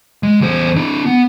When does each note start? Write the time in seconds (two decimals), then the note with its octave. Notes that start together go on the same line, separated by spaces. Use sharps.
0.23 G#3
0.41 E2 C5
0.76 D4 E4
1.06 B3